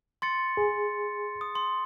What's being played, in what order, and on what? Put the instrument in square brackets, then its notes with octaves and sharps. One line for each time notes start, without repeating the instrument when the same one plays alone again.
[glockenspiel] C6 A6 C#7
[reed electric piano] G#4
[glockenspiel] D#6
C6